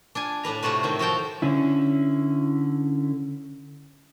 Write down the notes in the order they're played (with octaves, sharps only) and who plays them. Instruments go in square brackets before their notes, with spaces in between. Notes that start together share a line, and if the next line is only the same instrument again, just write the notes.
[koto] D4 F4 G#5
A2 D4 B4 A#5
C3 A3 F4 F#4 B4
A2 D#3 C4
F3 F#4 F5 G5 A5
[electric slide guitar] D3 C#4 E4